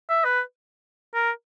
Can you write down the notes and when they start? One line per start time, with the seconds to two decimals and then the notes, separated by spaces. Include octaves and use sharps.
0.09 E5
0.24 B4
1.14 A#4